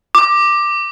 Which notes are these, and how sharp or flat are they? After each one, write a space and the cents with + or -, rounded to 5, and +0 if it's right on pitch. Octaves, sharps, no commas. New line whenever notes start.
D6 +10